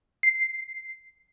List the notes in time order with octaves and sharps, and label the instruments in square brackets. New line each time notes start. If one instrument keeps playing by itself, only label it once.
[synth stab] C7